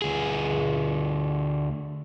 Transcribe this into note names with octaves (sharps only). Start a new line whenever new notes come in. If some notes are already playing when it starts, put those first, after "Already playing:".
D2 G#4